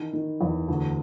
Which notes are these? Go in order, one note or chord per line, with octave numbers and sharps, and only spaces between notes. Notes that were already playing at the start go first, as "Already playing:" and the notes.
Already playing: D#3 E3
D#3
E2
D2